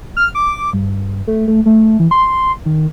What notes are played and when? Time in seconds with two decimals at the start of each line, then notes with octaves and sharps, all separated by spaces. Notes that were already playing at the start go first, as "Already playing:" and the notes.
0.17 F6
0.35 D6
0.73 G2
1.27 A3
1.48 A3
1.66 A3
2.00 E3
2.11 C6
2.66 D#3